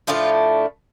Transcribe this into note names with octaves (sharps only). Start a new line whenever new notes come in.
A2 F3 A3 D4 F4